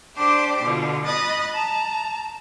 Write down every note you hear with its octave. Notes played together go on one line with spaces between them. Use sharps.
D4 G4 C5 C6 D6
B2 D3 F4
D#5 B5 D#6 F#6 A6
A5 A#5